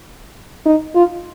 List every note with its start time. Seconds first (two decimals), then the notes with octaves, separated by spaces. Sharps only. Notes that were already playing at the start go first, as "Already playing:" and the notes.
0.66 D#4
0.95 F4